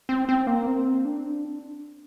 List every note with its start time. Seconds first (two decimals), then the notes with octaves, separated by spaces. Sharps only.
0.09 C4
0.29 C4
0.47 A#3
0.66 C4
1.05 D4